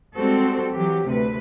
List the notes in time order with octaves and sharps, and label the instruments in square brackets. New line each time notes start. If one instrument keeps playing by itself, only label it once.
[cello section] G3 G#3 C4 F#4 A4
E3 F#3 G4
D2 C3 B4